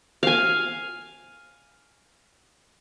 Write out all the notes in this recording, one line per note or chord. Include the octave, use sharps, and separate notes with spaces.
F5 G#5